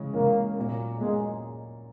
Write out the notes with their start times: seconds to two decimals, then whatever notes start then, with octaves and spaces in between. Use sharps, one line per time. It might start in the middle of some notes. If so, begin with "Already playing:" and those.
Already playing: C#3 E3 G#3 C#4
0.14 C#3 E3 G#3 A#3 C#4
0.57 A#2 F#3 A#3
0.99 A#2 F#3 G#3 A#3